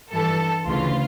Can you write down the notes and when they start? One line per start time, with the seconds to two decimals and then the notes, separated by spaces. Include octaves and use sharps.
0.11 G2 E3 A4
0.65 D2 C#3 E3 F4